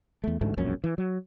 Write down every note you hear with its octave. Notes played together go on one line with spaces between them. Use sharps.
E2 A3
A1 D2 G#2 A3
E1 A#1 F#2 C#4
E3
F#3